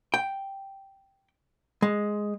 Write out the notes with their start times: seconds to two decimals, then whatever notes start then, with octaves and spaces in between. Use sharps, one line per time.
0.14 G5
1.82 G#3